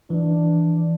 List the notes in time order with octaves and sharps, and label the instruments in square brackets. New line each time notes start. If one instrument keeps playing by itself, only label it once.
[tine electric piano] E3 [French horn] D4